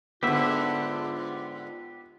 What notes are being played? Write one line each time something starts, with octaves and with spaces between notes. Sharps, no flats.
G#2 D3 B3 F4 G4 E5